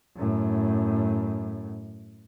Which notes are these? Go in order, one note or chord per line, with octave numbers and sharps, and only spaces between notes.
F#2 A2